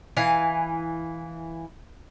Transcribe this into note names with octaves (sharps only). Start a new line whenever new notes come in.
E3 F5 G#5